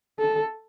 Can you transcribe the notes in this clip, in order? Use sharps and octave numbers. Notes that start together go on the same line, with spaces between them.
A4